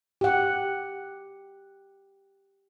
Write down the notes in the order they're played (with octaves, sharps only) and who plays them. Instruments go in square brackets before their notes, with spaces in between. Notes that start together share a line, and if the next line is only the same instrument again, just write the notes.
[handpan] G4 F#5